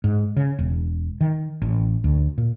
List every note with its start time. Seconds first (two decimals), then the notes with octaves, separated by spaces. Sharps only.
0.04 G#2
0.36 C#3
0.59 E1
1.21 D#3
1.62 A1
2.04 D2
2.38 A#2